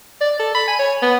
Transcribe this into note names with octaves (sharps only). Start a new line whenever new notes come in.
D5
A4
B5
G#5
C#5
B3